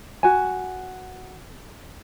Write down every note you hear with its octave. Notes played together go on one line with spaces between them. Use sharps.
F#4 G#5